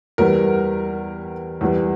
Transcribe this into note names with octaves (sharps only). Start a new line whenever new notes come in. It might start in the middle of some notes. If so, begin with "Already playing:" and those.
E2 E3 G3 A#4
E2 E3 G3